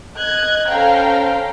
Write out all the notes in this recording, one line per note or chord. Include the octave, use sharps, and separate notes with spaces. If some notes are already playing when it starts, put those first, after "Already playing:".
D#5 F#6 G#6
C#4 A4 C5 F5 G5 A#5